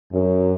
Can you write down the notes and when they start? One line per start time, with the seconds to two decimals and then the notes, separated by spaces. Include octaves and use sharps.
0.12 F#2